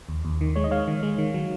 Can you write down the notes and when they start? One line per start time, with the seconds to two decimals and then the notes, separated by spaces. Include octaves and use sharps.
0.09 D#2
0.25 D#2
0.41 D#3
0.56 G#3 C#5
0.64 D#5
0.71 G#3 C#5 F5
0.88 D#3
1.03 G#3
1.18 D#3
1.34 F#3